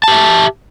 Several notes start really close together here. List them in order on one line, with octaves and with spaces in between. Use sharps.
A5 G4 E5